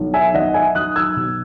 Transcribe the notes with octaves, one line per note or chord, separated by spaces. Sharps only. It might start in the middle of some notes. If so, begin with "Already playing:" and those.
Already playing: B1
E5 G#5
B1 D#5 F#5
E5 G#5
F#3 D#6 F#6
E6 G#6
B2